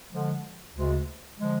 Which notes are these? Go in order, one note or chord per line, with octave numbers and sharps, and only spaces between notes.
D3 F3 G#3
D2 C#3 G#3
D3 F3 G#3